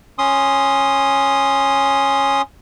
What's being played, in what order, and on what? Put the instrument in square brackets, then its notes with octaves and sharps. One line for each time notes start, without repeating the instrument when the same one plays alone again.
[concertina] C#4 C6 D#6